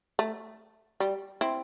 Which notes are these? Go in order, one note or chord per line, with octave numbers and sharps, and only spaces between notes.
A3
G3
C4 E4